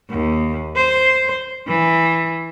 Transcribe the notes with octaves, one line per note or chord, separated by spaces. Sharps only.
D#2
C5
E3